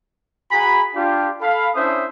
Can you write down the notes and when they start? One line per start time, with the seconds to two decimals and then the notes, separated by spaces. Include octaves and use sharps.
0.51 F#4 G#4 G#5 A#5 B5
0.95 D4 F4 G4
1.41 A4 F5 B5
1.75 C#4 D4 E4 C5 E5 D#6